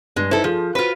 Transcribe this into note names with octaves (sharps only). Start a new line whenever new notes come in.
G2 G#3
D#4 E4 A4 B4 C5
F3 F4 G#4 A4
F4 F#4 B4 C5